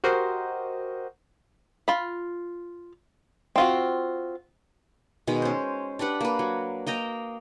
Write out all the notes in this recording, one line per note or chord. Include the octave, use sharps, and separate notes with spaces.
F#4 G4 A#4 C5 D#5
F4 B5
C4 F4 F#4
B2 D#3 G#3
C#4 C5
D4 G4 B4 F#5
A#3 B4
F#3
A#3 D#5 G5 A#5